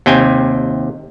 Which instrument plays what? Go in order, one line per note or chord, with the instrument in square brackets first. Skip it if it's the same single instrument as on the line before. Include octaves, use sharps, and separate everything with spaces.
[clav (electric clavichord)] D#2 C3 G5 G#5